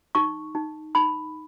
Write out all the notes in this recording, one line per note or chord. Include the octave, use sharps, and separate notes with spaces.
D#4 C#6
D#4
D#4 B5